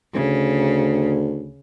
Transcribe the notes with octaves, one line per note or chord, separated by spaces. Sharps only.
D2 C#3